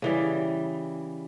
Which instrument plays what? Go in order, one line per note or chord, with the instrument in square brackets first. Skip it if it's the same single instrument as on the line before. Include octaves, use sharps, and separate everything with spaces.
[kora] C#3 E3 G3